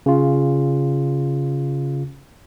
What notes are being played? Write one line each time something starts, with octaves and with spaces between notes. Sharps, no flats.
C#3 F4